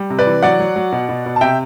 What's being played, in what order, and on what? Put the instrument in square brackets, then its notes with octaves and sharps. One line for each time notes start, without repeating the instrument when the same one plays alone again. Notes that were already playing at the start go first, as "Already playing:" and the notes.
Already playing: [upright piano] G3
C3
B4 D5
E3
F#3 D5 F#5
F#3
F#3
B2
B2
B2
A5
C3 E5 G5